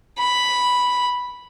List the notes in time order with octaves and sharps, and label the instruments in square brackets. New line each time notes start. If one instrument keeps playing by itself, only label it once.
[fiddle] B5